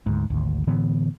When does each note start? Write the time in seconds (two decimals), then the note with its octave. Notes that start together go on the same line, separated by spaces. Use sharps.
0.06 D2 G#2
0.30 G#1 D2
0.67 A2 D3 E3 B3